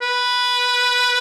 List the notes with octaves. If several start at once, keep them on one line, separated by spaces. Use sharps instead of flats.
B4